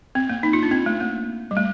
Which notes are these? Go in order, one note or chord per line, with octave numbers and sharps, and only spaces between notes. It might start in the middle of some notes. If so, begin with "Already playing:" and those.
C4
A#3
D#4
F4
D4
C4
A3
A#3
G3
A3